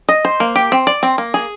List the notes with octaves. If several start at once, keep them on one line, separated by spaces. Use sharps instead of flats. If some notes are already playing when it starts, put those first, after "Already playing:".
D#5
C5
A#3
G4
C4
D5
C4
A#3
G#4